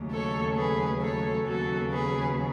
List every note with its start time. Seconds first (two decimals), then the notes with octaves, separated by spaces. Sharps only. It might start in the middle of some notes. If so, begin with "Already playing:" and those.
Already playing: D#2 C#3 F#3 A3
0.12 A4 C#5
0.57 G#4 B4
1.02 A4 C#5
1.47 D#2 C#3 F#3 B3 F#4 A4
1.92 G#4 B4